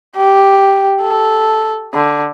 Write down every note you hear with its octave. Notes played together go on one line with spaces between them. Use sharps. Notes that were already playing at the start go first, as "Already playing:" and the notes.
G4
A4
D3